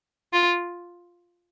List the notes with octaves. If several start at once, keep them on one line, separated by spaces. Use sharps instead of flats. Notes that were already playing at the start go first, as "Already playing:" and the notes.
F4